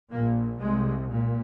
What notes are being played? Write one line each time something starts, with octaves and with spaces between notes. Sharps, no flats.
A#1 A#2 A#3
C2 C3 G#3
A#2